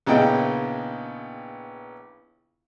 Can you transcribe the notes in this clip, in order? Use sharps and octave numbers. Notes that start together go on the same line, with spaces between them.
A#1 C#3 B3 E4 D#5 G5